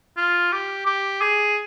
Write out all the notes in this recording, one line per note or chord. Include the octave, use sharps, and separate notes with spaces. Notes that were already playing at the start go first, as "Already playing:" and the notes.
F4
G4
G4
G#4